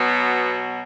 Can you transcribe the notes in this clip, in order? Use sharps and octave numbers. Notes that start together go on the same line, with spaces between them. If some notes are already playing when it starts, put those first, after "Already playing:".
Already playing: B2 F#3 B3